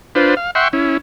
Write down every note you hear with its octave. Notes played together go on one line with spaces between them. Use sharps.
D4 F4 B4 C5
F5
E5 F#5 G5 C6 C#6
C#4 E4